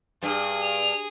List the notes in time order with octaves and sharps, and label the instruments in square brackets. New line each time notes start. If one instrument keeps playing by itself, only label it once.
[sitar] G2 [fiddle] G#4
[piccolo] F7